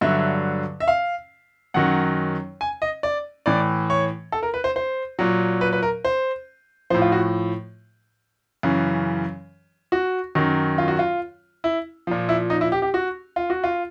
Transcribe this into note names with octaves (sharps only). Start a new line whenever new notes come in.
G2 D3 F#3 E5
E5
F5
F#2 D#3 F#3 F#5
G#5
D#5
D5
A2 E3 D5
C#5
A4
A#4
B4
C5
C5
A#2 F#3
B4
B4
A#4
C5
A2 F3 C5
F4
F#4
F#2 C#3 E3
F#4
F#2 D#3 F#3
F4
F#4
F4
E4
A#2 F3
E4
D#4
E4
G4
G4
F#4
F4
F#4
F4